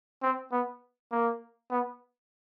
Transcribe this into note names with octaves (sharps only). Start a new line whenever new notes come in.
C4
B3
A#3
B3